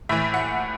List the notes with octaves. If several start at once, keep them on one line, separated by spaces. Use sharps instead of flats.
A2 E3 E5
F#5